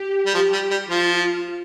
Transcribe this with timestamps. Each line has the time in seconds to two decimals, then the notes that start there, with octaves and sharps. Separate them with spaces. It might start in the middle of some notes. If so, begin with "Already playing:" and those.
Already playing: G4
0.26 G3
0.34 F3 G4
0.52 G3
0.71 G3
0.89 F3 F4